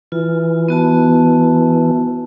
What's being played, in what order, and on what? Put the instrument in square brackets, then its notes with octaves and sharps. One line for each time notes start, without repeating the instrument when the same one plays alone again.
[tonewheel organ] E3 [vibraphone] F4
[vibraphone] B3 F#4 A5